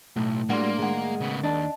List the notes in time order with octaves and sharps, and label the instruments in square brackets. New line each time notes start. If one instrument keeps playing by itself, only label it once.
[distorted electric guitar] B1 [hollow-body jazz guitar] A2
[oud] G3 G#3 F#4 [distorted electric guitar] A#3 [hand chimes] D4 C6
[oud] D#3 G#3 [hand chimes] G#4 F#5
[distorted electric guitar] C#3 B3
[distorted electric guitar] D#2 [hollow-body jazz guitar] D4 [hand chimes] D#5 A5